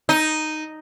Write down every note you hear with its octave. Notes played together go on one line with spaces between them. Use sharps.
D#4